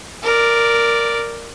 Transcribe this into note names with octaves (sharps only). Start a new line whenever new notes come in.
A#4 D5